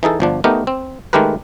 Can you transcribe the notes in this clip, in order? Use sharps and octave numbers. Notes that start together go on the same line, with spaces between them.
E3 D#4 G#4 A4
G1 F3 D4
A3 B3 D#4 G4 A#4
C4
D#3 G#3 A3 G4 A#4 B4